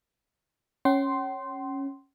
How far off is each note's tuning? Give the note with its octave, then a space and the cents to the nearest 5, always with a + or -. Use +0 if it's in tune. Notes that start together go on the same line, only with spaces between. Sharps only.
C#4 -10 G5 -45 C6 +0